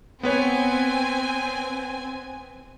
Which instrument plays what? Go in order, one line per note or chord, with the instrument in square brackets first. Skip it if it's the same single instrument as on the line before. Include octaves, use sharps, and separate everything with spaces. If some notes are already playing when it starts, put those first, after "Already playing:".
[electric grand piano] B3 B4 C#5 [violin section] C4 G#5